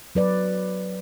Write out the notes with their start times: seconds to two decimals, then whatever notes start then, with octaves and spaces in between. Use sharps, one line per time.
0.15 F#3 B4 D5